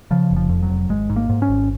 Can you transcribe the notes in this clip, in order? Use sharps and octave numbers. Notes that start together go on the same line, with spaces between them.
C#3 F3
F1
F3
F2
F#3
F1
G#1 G#3
G#2
A#3
G#2
C#4
G#1